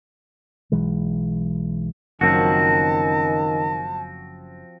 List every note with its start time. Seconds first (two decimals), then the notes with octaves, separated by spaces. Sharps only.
0.72 B1 E3 G#3
2.21 F#1 F#2 D#3 F3 C4 F#4 A5